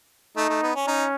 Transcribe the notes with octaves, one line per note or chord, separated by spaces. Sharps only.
A3 D#4
A3
B3
C#4
C#4 D#4